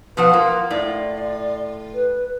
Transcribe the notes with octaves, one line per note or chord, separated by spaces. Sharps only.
B2 F3 B4 F#5
A#3 F4
A2 F4 D5
B4